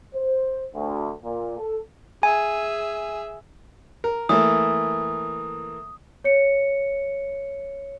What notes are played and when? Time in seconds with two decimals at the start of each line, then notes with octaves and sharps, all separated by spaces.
0.15 C5
0.75 D2
1.23 A#2
1.58 A4
2.23 G#4 E5 G#5
4.04 A#4
4.29 E3 A3 A#3 D#6
6.24 C#5 C#7